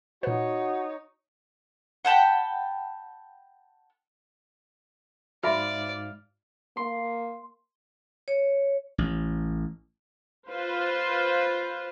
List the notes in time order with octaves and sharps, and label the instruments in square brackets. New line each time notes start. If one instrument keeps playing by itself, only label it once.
[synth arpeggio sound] A#2 B4 [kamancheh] D#4 C#5 [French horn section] F#4
[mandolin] F#5 G5 A5 B5
[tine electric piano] G#2 F5 F6 [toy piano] F#4 E5 B5 [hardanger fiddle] D5
[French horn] A#3 [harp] C6
[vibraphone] C#5
[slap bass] A1
[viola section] F4 B4 C5